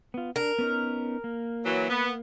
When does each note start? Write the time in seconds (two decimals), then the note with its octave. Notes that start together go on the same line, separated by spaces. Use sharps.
0.14 B3 F4
0.36 D4 A#4
0.59 B3 C#4 D#4
1.24 A#3
1.65 E3 F#3
1.90 B3